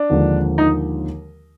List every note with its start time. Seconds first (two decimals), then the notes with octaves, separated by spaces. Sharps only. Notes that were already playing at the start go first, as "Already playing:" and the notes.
Already playing: D4
0.10 D#2 D3 F3 G#3
0.58 D#4